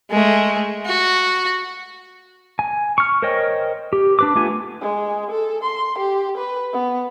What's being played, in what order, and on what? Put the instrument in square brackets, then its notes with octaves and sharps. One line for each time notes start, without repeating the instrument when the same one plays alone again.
[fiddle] G#3 A3
F#4
[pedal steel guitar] G#5
C#6 F6
A#4 C5 C#5 D#5 G5
G4
D4 B4 D6
A3 B3 F4 G4 G#5
[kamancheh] G#3
A4
C6
G4
B4
B3